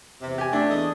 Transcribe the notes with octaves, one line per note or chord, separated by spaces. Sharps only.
E2 C3
G4 G#5
A3 D4
E2 A4 D#5